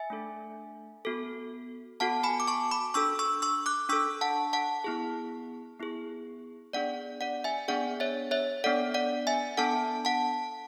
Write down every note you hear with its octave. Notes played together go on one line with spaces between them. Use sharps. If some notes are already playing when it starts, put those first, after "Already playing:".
Already playing: E5 G#5
A3 D4 A4
B3 F#4 A4
B3 F#4 A4 F#5 A5
G#5 B5
D6
A5 C#6
B5 D6
D4 A4 C#6 E6
C#6 E6
C#6 E6
D6 F#6
D4 A4 C#6 E6
F#5 A5
F#5 A5
B3 E4 G#4
B3 E4 G#4
B3 D4 G#4 D5 F#5
D5 F#5
E5 G#5
B3 D4 G#4 D5 F#5
C#5 E5
C#5 E5
B3 D4 A4 D5 F#5
D5 F#5
E5 G#5
B3 D4 A4 F#5 A5
F#5 A5